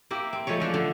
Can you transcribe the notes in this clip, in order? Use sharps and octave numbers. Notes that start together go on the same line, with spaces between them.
A#3 E4 G4
C4
F3 G#3 A3 C#5
E3 F3 D4
D3